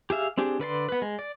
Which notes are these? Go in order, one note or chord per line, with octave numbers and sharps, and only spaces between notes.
G4 G#4 E5 F5
C4 D4 G4 G#4
D3 B4 D5 C6
B3 B4
G#3
D5